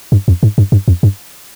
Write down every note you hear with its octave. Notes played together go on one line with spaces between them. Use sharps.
G2
F2
G#2
G2
G2
F2
G2